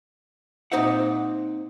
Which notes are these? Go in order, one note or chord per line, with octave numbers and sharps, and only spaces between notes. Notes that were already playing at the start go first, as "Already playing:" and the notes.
A#2 C4 D#4 C5 E5 F#5